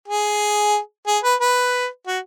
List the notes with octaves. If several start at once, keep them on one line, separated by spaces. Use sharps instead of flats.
G#4
G#4
B4
B4
F#4